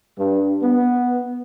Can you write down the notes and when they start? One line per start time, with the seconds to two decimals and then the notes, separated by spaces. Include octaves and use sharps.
0.19 G2
0.63 B3